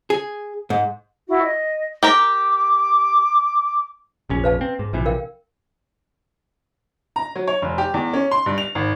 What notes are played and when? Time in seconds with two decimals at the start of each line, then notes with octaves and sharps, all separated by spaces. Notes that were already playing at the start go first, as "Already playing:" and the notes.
0.10 G#4
0.70 G#2
1.28 E4 F#4
1.43 D#5
2.03 G4 A#4 A#5 D6
4.29 F1 A#1 C#4
4.44 B4 F5 A5
4.61 C4
4.79 G#2
4.93 A#1 C3 E3
5.05 A#4 F5 G5
7.16 A#5
7.35 F#3
7.47 C#5
7.62 F1
7.78 G4
7.94 E2
8.13 C#4
8.31 C6
8.46 G2
8.58 F7
8.75 G#1